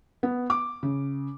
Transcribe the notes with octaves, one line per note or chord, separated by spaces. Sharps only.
B3
D6
C#3